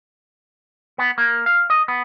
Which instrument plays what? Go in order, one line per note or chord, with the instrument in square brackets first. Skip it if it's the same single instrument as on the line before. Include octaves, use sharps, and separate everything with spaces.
[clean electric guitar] B3
A#3
F5
D#5
B3